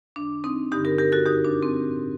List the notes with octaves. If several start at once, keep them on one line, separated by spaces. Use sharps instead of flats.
F#2 D#3 D4
C4 D#4
G2 D3 D#4 G4
G4 A#4
G4 A#4
F#4 A4
F#2 D3 D#4 G4
D4
C4
A2